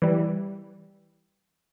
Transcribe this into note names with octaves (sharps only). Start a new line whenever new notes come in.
E3 G3